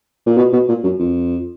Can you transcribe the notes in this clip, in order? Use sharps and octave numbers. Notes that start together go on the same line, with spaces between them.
A#2
B2
B2
A#2
F#2
F2